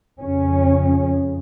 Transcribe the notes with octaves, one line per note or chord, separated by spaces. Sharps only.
F2 C#3 C#4